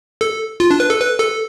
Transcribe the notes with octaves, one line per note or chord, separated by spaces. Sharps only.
A4
F4
D4
B4
A4
B4
A4